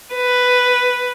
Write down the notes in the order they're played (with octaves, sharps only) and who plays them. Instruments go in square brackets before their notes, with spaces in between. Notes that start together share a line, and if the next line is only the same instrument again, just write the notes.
[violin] B4